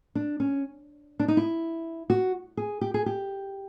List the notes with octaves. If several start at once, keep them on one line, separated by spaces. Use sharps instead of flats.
D4
C#4
D4
D#4
E4
F#4
G#4
G4
G#4
G4